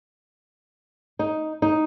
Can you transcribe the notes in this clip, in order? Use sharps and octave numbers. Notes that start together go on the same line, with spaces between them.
D#4
D#4